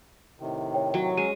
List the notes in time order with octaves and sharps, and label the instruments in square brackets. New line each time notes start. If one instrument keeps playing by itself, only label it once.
[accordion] A2 C3 D#3
[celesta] C#5 G5
[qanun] F#3
[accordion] F#3 C#4 [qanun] G#3 [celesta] D#7